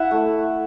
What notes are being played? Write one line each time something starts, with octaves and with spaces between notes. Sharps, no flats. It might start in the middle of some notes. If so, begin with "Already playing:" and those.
Already playing: E4 E5 F#5
A3